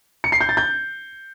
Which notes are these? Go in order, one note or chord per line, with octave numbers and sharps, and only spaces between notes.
C#7
C7
G6
A6
G6